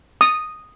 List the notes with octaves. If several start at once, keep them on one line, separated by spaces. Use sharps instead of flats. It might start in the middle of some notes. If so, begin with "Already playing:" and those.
D#6